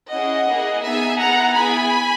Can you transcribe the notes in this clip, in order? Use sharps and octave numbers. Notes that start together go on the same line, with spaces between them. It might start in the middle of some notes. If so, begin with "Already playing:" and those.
C#4 E4 G#4 D#5 F#5
A#3 E4 G#4
B3 D#4 G#4 E5 G#5
B3 E4 G#4 F#5 A#5
B3 E4 G#4 G#5 B5